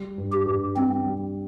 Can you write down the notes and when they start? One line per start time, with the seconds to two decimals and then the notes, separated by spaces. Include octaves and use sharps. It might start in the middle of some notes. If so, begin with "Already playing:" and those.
Already playing: G3
0.18 G2
0.32 G4
0.47 G2
0.76 G3 C4
1.06 G3